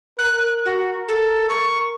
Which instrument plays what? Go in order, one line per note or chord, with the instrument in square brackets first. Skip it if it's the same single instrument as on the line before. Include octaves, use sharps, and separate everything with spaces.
[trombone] A#4 [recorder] F#6
[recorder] F#4
A4
C#6